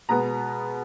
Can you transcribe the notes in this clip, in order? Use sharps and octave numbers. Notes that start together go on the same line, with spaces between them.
B2 G#3 B3 A#5